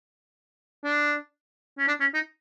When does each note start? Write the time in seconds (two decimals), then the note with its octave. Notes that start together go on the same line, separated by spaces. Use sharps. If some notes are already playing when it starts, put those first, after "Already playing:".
0.84 D4
1.78 C#4
1.88 D4
2.01 C#4
2.14 D#4